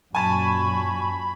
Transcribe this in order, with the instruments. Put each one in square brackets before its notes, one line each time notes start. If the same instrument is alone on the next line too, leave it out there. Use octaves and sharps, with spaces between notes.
[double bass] F#2 A#2 [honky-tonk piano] G#5 A5 [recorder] B5 [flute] C#6